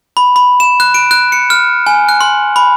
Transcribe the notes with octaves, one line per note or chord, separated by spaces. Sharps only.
B5
B5
E7
F#6
D7
F#6
C#7
F6
G#5
F#6
C6
B5